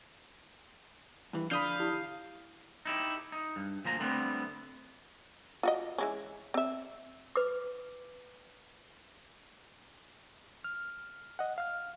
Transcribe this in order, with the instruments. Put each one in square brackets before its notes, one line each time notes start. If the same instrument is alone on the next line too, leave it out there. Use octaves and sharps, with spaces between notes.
[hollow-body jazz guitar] G2 E3
[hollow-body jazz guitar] D3 F3 D4 [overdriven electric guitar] F5 [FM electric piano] B5 D#6 G6
[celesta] E4 G4
[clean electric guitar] D#4 E4 G4
D#4
G2
D2 F3 A#3 A#5
D3 G3 A3 B3 C4
[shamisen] F4 F#4 D#5
E3 G#3 C#4
C4 E5
[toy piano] B4 D6
[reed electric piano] F6
D#5 F#5
F5 F6